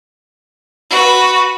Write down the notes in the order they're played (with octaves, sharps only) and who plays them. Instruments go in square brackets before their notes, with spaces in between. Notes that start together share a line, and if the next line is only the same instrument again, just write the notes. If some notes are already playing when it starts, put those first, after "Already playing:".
[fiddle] F#4 B4